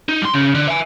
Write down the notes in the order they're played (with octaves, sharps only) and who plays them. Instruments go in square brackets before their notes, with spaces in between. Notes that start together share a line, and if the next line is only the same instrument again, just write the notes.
[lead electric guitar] D#4
G3 C6
C#3
D3
E5 G#5